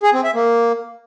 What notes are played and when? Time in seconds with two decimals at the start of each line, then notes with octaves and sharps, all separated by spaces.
0.03 G#4
0.14 C4
0.24 E5
0.35 A#3